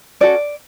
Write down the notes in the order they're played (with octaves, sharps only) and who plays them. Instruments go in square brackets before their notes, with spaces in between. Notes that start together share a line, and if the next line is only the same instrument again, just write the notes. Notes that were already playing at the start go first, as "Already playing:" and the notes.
[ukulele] C#4 F#4 A4 D5